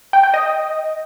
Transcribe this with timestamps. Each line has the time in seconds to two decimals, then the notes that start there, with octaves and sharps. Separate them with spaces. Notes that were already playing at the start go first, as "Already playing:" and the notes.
0.13 G5
0.23 G5
0.34 D#5